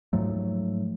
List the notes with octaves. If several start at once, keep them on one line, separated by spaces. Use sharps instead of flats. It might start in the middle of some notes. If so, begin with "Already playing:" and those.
G#2 F3 F#3 A3